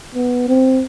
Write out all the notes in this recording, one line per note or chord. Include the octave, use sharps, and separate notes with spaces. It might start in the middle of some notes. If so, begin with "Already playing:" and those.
B3
C4